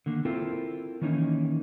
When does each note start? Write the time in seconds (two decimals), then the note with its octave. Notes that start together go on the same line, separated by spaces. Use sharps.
0.06 D3 D#3 A#3
0.25 C4 E4 F4 A4 A#4
1.02 D#3 E3 A#3 C#4 D#4